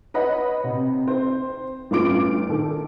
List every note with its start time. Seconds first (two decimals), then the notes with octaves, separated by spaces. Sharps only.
0.14 B4 C#5 D#5 F#5 B5
0.64 C3
1.07 C4 C5
1.91 G1 A2 C#4 F4 D6 D7
2.49 D#3 A4